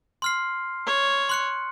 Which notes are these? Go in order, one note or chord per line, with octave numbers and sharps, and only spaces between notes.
C6 F6 C7
C#5
C6 F#6 C#7